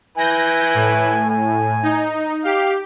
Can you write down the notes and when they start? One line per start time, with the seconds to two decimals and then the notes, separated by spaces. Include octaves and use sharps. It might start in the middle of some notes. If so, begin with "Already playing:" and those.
0.18 E4 B4 G#5 G6 A#6
0.75 A2
1.30 G#5
1.83 D#4
2.45 G4 F5